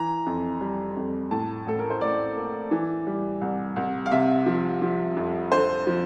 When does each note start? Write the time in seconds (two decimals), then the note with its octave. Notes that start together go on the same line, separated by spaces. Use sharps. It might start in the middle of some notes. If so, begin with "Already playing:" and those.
Already playing: E3 A#5
0.26 F2
0.61 G3
0.96 F2
1.31 A2 A5
1.66 A1 A4
1.79 A#4
1.90 C5
2.01 A1 D5
2.36 A#3
2.71 E3
3.07 G3
3.41 C2
3.76 C2
4.06 F5
4.11 C3 E5
4.46 F3
4.82 F3
5.17 F2
5.52 D3 C5
5.87 F3